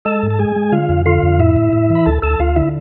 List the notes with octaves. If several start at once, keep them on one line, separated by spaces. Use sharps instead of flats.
G#3 A4 A5
G#2
A5
G#3 G#4 G#5
G#3
D3 F4 F5
F2
D3 F4 F5
F2
A2 E4 E5
A2
A2
E3
B5
D2 A4 A5
D2 A4 A5
D2 F4 F5
D3 E4 E5